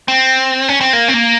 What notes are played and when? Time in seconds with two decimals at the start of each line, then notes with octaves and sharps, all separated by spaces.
0.08 C4
0.69 C#4
0.81 C4
0.93 A#3
1.08 C4
1.14 A#3